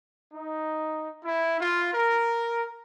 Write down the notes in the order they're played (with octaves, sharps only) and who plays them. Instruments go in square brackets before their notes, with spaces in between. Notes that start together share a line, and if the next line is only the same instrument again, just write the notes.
[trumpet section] D#4
E4
F4
A#4